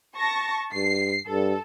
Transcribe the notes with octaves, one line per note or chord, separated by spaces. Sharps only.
A5 C#6 A#6
G2 C7
G2 A4